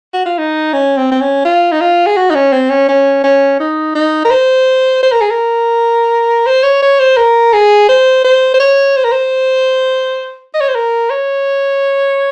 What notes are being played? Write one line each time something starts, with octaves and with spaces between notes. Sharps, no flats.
F#4
F4
D#4
C#4
C4
C4
C#4
F4
D#4
F4
G#4
F#4
D#4
C#4
C4
C#4
C#4
C#4
D#4
D#4
A#4
C5
C5
A#4
G#4
A#4
C5
C#5
C#5
C5
A#4
G#4
C5
C5
C5
C#5
C5
A#4
C5
D#5
C#5
C5
A#4
C#5